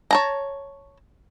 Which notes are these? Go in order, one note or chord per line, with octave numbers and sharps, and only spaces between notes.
C#5 A5 A#5